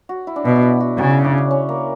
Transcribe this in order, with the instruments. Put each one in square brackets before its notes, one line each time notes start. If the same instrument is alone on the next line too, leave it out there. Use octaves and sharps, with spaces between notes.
[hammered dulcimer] F#4
E4
D4
[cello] B2 [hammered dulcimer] E4
[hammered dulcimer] F#4
E4
F#4
[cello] C#3 [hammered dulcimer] F#4
[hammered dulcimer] E4
D4
C#4
C#4
A#3